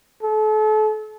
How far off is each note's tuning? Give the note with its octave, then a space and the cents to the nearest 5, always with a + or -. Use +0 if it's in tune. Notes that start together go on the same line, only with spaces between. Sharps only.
A4 -35